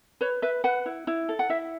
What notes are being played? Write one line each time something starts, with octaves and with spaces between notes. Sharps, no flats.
B4 C#5
B4 E5
B4 F#5
E4
E4
A4
F#5
E4 E5